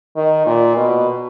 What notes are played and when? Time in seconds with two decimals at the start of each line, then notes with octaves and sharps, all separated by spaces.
0.16 D#3
0.46 A#2
0.76 B2